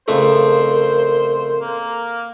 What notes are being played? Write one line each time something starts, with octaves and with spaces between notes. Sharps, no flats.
F2 C#3 A3 A4 A#4 C5
A#3